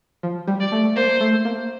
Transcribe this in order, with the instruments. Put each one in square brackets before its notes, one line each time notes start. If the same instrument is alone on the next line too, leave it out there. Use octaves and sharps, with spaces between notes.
[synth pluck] F3
G3
[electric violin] D5
[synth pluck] A3
[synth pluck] A#3 [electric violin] C5
[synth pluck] A3
A#3